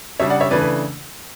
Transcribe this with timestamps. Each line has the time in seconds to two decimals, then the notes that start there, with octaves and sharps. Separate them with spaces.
0.20 C#3 G3 D4 C#5 E5
0.30 D5 F#5
0.40 C#5 E5
0.51 C#3 E3 A3 D4 B4 D5
0.61 B4